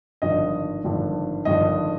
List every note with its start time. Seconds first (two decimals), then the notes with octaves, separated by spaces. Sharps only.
0.22 G#1 G2 D3 F3 D#5
0.84 G#1 G2 D3 F3
1.45 G#1 G2 D3 F3 D#5